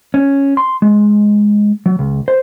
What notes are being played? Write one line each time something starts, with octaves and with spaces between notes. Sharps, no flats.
C#4
C6
G#3
F#3
C#2
C5